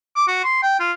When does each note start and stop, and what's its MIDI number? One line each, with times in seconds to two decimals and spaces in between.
0.16 0.26 86
0.28 0.40 66
0.44 0.58 84
0.63 0.78 79
0.80 0.92 65